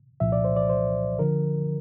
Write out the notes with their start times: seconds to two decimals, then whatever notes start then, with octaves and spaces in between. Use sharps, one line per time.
0.20 C2 A#2 F3 E5
0.32 D5
0.44 C5
0.56 D5
0.69 C5
1.19 D3 F3 A#4